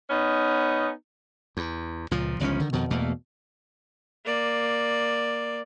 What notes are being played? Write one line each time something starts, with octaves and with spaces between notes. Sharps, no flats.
B3 C#4 D#4
E2
C#2 A#2 F3
G1 C#2 F3 C#4
D3 D#3
F2 B2 D#3
E2 B2 A3 A#3
A#3 D5